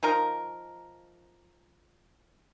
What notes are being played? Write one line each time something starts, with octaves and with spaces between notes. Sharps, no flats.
F3 D#4 A#4